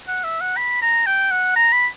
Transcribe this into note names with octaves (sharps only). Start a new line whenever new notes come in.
F#5
E5
F#5
B5
A#5
G5
F#5
A#5
B5